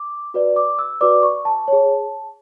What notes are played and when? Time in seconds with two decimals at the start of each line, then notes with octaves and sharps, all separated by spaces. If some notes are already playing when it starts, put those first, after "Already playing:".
Already playing: D6
0.34 F#4 B4 D5
0.56 D6
0.79 E6
1.01 F#4 B4 D5 D6
1.23 C#6
1.45 A5
1.68 G#4 C#5